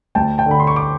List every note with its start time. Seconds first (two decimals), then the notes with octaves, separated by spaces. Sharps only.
0.15 D2 G5 A5
0.38 G5 A5
0.46 D3
0.51 B5
0.60 C6
0.67 C#6
0.76 D6